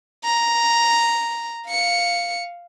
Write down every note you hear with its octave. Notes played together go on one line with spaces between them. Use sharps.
A#5
F5 C#7